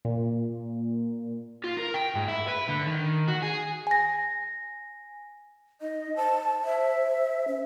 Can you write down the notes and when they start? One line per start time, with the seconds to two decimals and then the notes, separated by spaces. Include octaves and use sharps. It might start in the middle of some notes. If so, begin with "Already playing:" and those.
0.05 A#2
1.64 F4
1.77 A#4
1.94 G5
2.16 G#2
2.28 E4
2.49 B4
2.69 D3
2.87 D#3
3.28 F#4
3.43 G#4
3.87 G#5 A#6
5.81 D#4 D#5
6.16 C5 A5
6.65 E5
7.48 C#4